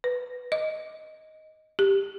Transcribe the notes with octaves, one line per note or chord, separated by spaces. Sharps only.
B4
D#5
G4